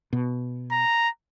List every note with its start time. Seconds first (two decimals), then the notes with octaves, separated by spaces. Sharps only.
0.13 B2
0.72 A#5